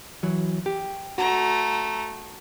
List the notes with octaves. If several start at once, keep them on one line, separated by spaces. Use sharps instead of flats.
E3 F#3
G4
A3 F#4 A#5